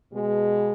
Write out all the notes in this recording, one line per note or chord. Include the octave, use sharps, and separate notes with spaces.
B2 G#3